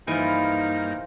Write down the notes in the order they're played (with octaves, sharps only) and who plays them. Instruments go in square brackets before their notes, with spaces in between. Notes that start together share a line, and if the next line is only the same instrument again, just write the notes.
[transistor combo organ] G2 A#3 [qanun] E3 G#5 [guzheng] F3 A#4 [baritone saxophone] D#4